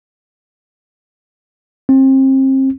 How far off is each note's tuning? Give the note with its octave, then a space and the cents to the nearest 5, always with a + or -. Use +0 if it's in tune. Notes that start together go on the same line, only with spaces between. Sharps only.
C4 +30